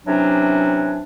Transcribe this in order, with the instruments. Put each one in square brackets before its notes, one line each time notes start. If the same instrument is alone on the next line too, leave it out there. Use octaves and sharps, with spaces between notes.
[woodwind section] C3 E3 F#3 C#4 D4